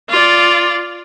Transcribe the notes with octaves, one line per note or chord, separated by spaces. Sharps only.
F4 D5